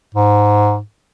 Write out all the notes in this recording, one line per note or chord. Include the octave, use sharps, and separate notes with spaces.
G#2